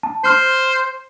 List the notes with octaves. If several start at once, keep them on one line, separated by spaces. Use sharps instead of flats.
A5
C5 C6 F6 C7